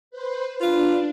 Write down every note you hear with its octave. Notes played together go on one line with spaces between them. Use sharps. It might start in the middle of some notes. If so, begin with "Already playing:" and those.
B4 C5
D4 F4 B4